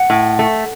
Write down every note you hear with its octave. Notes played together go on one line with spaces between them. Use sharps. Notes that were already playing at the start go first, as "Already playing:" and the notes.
Already playing: F#5
A2
A3